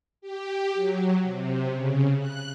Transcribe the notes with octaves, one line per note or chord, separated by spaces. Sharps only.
G4
F#3
C3
C#3
F#6